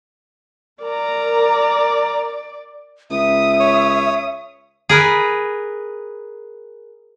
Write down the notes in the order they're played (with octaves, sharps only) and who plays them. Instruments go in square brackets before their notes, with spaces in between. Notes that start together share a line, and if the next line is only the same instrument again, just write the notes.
[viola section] A#4 A#5 [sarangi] D5
[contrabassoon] C#2 [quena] E5 [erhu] D#6
[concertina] C#5
[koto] G#4 A#4 B4